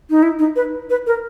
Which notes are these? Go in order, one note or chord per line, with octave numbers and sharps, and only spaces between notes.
D#4
E4
D#4
B4
B4
A#4